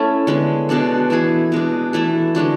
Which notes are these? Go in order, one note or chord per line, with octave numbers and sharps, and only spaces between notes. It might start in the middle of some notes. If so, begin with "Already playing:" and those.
Already playing: A3 C#4 E4 A4
D3 G#3 B3
B2 G#3 D4 A4
E3 A3 E4 G#4
B2 G#3 D4
E3 A3 E4 A4
D3 G#3 D4 F#4